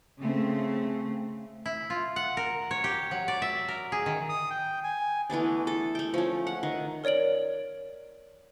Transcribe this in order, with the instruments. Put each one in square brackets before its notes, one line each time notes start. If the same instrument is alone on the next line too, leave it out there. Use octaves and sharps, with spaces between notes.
[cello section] C#3 A3 C4
[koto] E4
F4
F#5
A#4
C#5
G4
F#3
D5
E5
A#4
G#4
D#3
[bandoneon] D#6
G5
G#5
[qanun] E3 A3 B3 D4
A4
A3 G5
F3 C#4
F#5
D#3
[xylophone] A#4 C#5 D5 D7 F#7